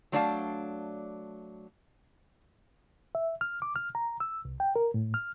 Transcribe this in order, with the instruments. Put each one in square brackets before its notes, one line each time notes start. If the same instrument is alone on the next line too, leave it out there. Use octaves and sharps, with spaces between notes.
[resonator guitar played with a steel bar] F#3 A3 D4 D5 F5 A5
[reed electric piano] E5
F6
D6
F6
A#5
E6
C2
G5
A#4
A2
F6